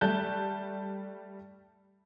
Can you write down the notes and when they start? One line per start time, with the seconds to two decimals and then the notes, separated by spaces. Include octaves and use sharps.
0.01 G3 A3 A5 F#6 G6